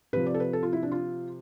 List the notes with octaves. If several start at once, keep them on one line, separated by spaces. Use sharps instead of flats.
C3 F3 B4
D5
A4
B4
A4
F4
E4
D4
F4